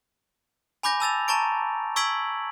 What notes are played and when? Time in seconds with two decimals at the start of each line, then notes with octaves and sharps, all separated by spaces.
0.83 G#5 B5 D6 G6 A#6
1.00 A5 E6 A6 F7
1.28 A5 A#5 C#6 A6 D7
1.96 C#6 E6 G#6 B6 D7 F#7